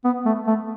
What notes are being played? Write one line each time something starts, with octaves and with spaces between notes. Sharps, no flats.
B3
A3
A3